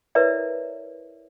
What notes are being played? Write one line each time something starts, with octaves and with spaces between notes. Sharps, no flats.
E4 A#4 B4 C#5 D5 E5